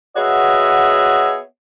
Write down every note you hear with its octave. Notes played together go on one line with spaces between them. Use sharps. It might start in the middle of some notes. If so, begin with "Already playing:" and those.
B3 F#4 G#4 C#5 D#5 E5